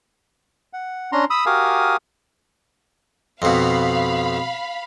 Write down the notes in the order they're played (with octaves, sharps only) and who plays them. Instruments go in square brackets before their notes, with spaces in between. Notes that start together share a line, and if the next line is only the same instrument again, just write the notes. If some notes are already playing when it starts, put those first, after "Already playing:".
[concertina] F#5
C#4 D4 A#5 C6
B5 D#6 E6
F#4 G4 A#4 F5 G#5 D#6
[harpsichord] F2 B2 [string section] F5 B5